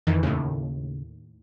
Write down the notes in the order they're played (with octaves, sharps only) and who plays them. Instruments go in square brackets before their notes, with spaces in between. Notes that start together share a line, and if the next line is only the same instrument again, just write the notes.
[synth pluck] F2 E3 [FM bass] D#3
[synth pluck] D#2 A2 [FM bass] C#3